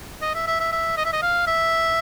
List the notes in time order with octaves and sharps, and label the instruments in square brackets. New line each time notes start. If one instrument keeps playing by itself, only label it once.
[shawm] D#5
E5
E5
E5
E5
D#5
E5
D#5
F5
E5